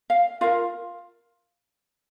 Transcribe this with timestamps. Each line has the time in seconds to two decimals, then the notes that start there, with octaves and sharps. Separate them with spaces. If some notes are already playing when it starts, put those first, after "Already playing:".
0.10 F5
0.41 F4 A#4 F5